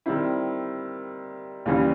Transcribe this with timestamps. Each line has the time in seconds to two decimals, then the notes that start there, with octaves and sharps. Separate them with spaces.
0.06 D#3 G3 C4 E4
1.66 D#2 C#3 E3 G3